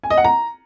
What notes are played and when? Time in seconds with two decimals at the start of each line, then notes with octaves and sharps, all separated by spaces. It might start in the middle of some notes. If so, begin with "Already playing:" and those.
0.03 G#5
0.10 D#5
0.17 F#5
0.24 A#5